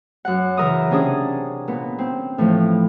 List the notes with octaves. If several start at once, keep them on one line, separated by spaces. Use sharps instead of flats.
F#2 F#5
C#3 E3 A#4 E5 D#6
C3 C#4 D4 G#4 D#6
A#2 B3
C4
A2 E3 F3